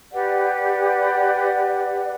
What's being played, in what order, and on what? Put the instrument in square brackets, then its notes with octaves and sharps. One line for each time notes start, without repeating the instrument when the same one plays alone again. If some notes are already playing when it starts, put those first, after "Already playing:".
[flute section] G4 B4 D5 F#5